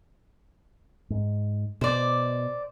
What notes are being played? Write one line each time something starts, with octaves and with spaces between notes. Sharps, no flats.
G#2
B2 C5 D5